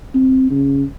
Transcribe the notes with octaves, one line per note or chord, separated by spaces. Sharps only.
C4
C#3